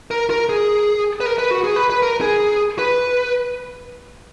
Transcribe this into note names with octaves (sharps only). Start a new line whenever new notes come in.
A#4
A#4
G#4
B4
A#4
B4
F#4
G#4
B4
B4
A#4
G#4
B4